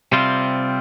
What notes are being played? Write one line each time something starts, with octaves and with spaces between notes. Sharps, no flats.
C3 G3 C4 F4